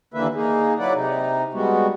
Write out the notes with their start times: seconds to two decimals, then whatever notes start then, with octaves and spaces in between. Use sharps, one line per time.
0.14 D#2 D3 E3 A#3 B4 E5
0.35 A#3 D#4 G#4
0.79 F#3 E4 B4 D5 F#5
0.94 C3 D#4
1.54 G3 G#3 B3 F#4